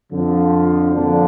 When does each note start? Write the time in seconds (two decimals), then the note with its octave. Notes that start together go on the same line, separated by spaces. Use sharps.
0.11 F2 D3 F3
0.94 F2 D3 F3 A#3 D4